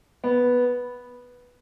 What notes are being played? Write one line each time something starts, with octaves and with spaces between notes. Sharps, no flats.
B3